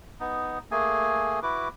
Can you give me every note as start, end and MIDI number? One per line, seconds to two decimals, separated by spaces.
0.20 0.59 59
0.20 0.59 63
0.71 1.40 57
0.71 1.40 58
0.71 1.40 68
0.71 1.40 80
1.43 1.68 64
1.43 1.68 66
1.43 1.68 71
1.43 1.68 86